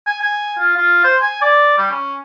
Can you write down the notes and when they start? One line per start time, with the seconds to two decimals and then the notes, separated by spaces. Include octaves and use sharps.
0.06 G#5
0.21 G#5
0.59 F4
0.77 F4
1.04 C5
1.21 G#5
1.42 D5
1.78 G3
1.91 C#4